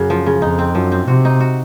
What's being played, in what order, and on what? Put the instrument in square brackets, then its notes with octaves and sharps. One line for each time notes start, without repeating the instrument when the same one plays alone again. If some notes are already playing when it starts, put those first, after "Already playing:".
Already playing: [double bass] F#2 [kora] C#3
[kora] F3
C#3
[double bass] F2 [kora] D#4
[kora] C4
[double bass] F#2 [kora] F3
[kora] C4
[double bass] C3 [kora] F#4
[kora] D#4
F#4